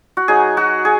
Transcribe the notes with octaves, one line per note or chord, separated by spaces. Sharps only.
F#4
F#3 D#4 G#4
F#4
G#4